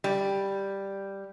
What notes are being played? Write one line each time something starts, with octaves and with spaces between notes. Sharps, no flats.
G3